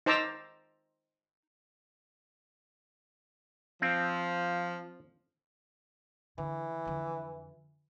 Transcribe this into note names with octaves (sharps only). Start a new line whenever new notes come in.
D#4 C5 A5 A#5 D6 E6
F3 C4
D3 E3
F2 D3